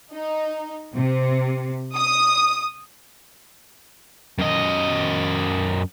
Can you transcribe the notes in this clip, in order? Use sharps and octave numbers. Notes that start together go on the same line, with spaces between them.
D#4
C3
D#6
F#2 D#5